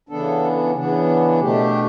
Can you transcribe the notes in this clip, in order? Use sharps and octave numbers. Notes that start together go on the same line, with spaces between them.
C#3 E3 B3 D4 A4
C#3 E3 B3 D4
B2 A3 D4 G4